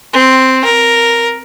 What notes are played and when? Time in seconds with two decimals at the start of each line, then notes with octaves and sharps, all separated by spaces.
0.13 C4
0.65 A#4